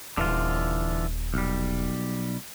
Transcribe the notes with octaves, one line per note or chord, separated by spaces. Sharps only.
D#1 D3 E3 F4
B1 G3